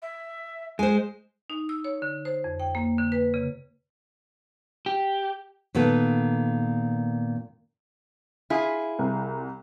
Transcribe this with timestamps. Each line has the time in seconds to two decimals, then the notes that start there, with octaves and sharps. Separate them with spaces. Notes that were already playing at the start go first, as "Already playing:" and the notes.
0.02 E5
0.79 G#3 C5 G#5
1.50 D#4
1.69 E6
1.85 C#5
2.02 D3
2.25 C5
2.44 F2
2.60 G5
2.75 A#3
2.98 D3
3.12 B4
3.34 C#3
4.86 G4
5.75 A#2 D#3 B3 A4
8.50 E4 F4 G#4
8.99 C2